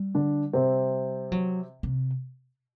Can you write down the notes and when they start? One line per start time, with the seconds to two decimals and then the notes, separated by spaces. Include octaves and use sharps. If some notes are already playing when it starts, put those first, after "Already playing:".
Already playing: G3
0.15 D3 D4
0.53 C3 C4
1.32 F#3
1.83 C3